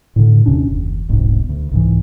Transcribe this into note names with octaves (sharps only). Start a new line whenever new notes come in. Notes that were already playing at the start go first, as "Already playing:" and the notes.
A2 D3
D#2 C3 C#4 D4
F#1 D#2
D#1 C2 G#2 B2
D2
C2 G#2 E3